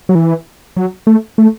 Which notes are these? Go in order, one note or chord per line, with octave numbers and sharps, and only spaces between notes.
F#3
E3
F#3
A3
A3